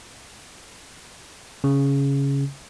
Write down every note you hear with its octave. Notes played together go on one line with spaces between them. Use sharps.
C#3